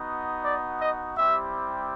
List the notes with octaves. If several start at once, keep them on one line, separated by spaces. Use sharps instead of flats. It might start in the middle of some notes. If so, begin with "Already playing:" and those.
Already playing: B3 D#4 F#4
D5
D#5
G3 C4 E4 G4 E5